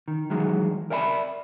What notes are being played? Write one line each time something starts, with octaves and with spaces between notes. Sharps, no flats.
D#3
D#3 E3 F#3 G#3
A#4 D5 E5 F#5 B5